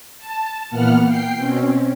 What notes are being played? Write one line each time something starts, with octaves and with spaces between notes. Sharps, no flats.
A5
A#2 E3 A#3 B3 F#5 F6
G5 C7
B2 C4 C#4